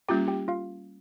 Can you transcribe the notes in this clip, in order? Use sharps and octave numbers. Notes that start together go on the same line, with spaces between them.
G3 A#3 C#4 F4 G4 G5
G4 G5
F4 F5